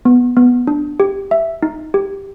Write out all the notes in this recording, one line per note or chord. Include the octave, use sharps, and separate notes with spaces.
B3
B3
D4
G4
E5
D#4
G4